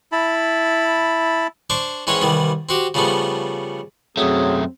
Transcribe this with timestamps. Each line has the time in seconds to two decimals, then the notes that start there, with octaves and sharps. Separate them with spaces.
0.12 E4 A5 B5
1.70 D4 C5 C#6 D6
2.07 G#2 E3 C4 C#4 C#5 F#5
2.21 C2 D#3 E3 G3
2.69 C4 F#4 G4
2.94 C#3 F3 G3 A3 B3
4.17 F#2 F#3 A3 C4 G#4